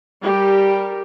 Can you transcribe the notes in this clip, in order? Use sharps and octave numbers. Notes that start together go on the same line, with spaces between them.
G3 G4 A#4